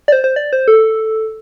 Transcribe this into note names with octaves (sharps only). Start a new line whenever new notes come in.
D5
C5
C5
D5
C5
A4